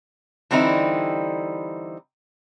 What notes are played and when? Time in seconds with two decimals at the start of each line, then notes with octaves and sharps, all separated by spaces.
0.51 D3 E3 G3 C4 D#4 E4